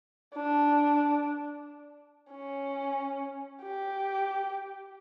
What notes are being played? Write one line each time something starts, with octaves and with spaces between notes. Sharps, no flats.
D4
C#4
G4